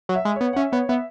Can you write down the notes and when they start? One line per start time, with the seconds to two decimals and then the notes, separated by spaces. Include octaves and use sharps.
0.09 F#3
0.15 E5
0.25 G#3
0.36 B3 C#5
0.53 F#5
0.56 C#4 E5
0.72 B3 C#5
0.89 B3 E5